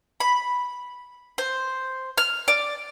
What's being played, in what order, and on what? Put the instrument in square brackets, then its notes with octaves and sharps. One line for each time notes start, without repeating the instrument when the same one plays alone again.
[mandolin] B5
C5
F6
D5